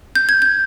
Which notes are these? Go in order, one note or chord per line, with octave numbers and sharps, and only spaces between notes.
G6
G#6
G6